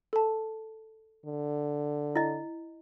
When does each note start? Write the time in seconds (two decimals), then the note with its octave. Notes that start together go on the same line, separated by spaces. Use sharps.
0.13 A4 A5
1.26 D3
2.15 E4 D#5